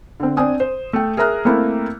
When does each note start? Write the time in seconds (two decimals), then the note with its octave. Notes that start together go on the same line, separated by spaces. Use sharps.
0.20 D3 C4
0.37 C4 D4 G#5 D#6
0.60 C5
0.93 A3 G5
1.17 G#4 A#4 E5 A#5 F6 F#6
1.45 A3 A#3 C4 E4